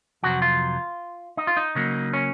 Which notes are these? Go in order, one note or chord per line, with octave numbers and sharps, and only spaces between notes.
F2 C3 F#3 F#4
F4
D#4
F4
D#4
C#3 F#3 A#3
C#4